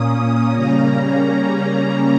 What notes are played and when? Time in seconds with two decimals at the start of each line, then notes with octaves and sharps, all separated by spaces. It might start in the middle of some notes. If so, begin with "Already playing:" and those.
Already playing: A#2 A#3 C#4 D#6
0.54 C#3 G3 A#3 C#4 A#5